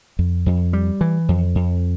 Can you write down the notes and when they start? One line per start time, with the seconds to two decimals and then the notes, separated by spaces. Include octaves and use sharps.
0.19 F2
0.46 F2
0.73 G3
1.01 E3
1.29 F2
1.55 F2